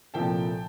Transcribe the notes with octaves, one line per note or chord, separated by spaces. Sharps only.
C2 A#2 F3 A3 G5 A5